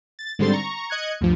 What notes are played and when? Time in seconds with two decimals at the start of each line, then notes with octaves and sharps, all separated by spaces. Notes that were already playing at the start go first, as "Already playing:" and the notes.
0.19 A6
0.39 G#2 D3 G3 C4 C6 A6
0.53 A#5 C#6
0.88 D#5 F#6 G#6 C#7
1.21 D2 G2 F3